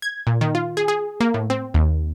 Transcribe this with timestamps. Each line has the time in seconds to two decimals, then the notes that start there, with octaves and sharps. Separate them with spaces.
0.02 G#6
0.27 A#2
0.41 D#3
0.55 F4
0.77 G#4
0.88 G#4
1.20 A#3
1.34 A2
1.50 C4
1.74 D#2